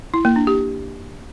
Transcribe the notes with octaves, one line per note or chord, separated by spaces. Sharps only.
E4
A#3
D4
G4